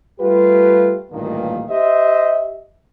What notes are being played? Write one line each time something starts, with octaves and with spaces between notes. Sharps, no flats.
G3 A3 F4 G4 B4
A1 D2 G2 A#2 D#3 A#3
G4 C5 D#5 E5